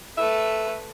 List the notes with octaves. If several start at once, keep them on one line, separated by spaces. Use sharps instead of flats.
A3 B4 E5